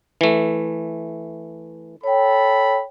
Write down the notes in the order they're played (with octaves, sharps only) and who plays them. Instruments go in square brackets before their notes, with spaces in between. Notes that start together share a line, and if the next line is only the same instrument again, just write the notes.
[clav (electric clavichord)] E3 A3
[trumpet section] A4 B5 [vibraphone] C#5 G5